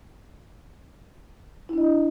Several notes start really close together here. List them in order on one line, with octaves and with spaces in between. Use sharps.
E4 D4 D#5